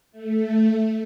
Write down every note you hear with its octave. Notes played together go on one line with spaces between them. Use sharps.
A3